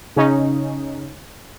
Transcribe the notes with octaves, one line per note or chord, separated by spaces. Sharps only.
C#3 C#4 D#4